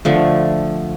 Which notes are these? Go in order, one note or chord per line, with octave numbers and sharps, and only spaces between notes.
D3 F3 A3